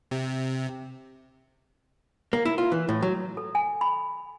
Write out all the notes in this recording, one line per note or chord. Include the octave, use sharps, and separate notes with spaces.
C3
A#3
E4
F4
E3
A2
F#3
A4
G#5
B5